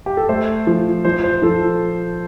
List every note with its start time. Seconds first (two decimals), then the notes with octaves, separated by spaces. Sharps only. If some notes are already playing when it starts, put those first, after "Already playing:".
0.06 G4
0.17 A4
0.29 A3 C5
0.67 F3
1.05 F3 C5
1.24 C5
1.42 F3 A4